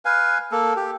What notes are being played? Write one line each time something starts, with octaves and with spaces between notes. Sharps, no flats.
B4 F5 G#5
A#3 A4
G4